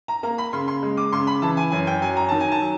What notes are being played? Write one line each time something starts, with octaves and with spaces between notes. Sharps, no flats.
A#5
A#3 A#5
B5
C#3 C6
C6
G#3
D6
C#3 C6
B5
E3 A5
G#5
F#2 G#5
G5
F#3 G#5
A#5
D#3 A5
G#5
A5
F#3